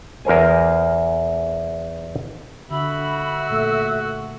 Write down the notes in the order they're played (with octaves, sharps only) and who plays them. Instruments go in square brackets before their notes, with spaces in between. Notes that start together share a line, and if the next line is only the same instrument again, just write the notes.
[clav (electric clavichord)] E2 A#4 C5 G#5
[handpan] D3 [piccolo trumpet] F#4 [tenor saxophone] E5 [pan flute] B5
[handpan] A#2 A3 [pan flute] A4